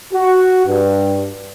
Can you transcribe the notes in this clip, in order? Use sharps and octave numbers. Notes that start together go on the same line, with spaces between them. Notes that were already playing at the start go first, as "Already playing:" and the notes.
F#4
G2